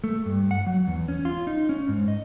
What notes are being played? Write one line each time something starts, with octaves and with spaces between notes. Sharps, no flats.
A3
G2
F#5
F#3
E2
C#4
F4
D#4
C#4
G#2
D#5